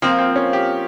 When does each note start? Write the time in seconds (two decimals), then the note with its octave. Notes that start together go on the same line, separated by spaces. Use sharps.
0.02 F3 A#3 C4 F4
0.18 C4
0.36 C#4
0.53 G4